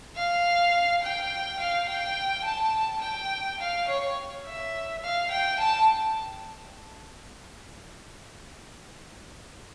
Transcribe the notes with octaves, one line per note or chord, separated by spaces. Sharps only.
F5
G5
F5
G5
A5
G5
F5
C#5
E5
F5
G5
A5